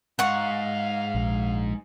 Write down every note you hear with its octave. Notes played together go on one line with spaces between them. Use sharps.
G#2 F5 F#5 C#6
A#1